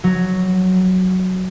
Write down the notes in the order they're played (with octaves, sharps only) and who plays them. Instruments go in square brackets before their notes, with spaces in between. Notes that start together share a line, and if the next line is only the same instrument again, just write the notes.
[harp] F#3